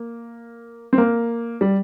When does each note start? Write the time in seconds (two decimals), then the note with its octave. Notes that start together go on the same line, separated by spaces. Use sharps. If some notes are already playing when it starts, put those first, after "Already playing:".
Already playing: A#3
0.93 C4
0.98 A#3
1.61 G3